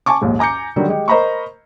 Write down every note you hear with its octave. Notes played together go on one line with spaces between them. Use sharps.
G#5 A5 C#6 D6
A#1 D#2 G#2
G#5 A#5 D6 G6 C#7
D3 D#3 F#3 G3
G#3 G4
A#4 C5 D#5 A#5 B5 C#6